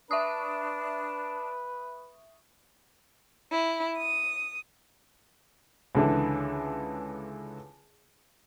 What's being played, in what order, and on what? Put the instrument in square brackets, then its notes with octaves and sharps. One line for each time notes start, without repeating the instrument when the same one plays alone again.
[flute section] D4 A5 [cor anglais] B4 [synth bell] E5 C#6 D#6
[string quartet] E4
D#6
[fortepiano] C#2 D3 E3